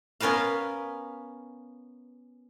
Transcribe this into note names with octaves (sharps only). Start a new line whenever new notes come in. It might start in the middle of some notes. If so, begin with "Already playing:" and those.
B3 C#4 A#4 B4 F5